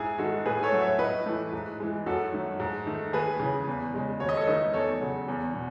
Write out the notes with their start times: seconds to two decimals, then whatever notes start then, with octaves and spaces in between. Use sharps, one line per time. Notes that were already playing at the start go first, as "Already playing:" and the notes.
Already playing: G#2 E4 G#4
0.18 D#3 G#3 F#4 A4
0.46 A2 G#4 B4
0.63 A4 C#5
0.72 F#3 A3
0.81 C#5 E5
0.99 A2 B4 D#5
1.26 E3 A3
1.53 G#2
1.80 E3 G#3
2.06 F#2 F#4 A4
2.32 D#3 F#3 A3
2.60 G#2
2.86 D#3 A3
3.13 D#2 G#4 B4
3.40 C#3 E3
3.67 E2
3.94 C#3 G#3
4.20 D#2 C#5
4.29 D#5
4.37 A4 C#5
4.47 D#3 A3 B4 D#5
4.74 E2 A4 C#5
5.00 C#3 F#3
5.28 E2
5.54 B2